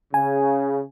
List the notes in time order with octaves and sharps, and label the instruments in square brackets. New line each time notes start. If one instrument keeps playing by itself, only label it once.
[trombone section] C#3 [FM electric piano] G#5